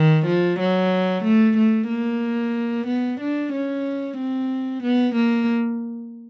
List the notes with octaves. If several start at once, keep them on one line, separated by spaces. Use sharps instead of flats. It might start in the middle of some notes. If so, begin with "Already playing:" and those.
Already playing: D#3
F3
F#3
A3
A3
A#3
B3
D4
C#4
C4
B3
A#3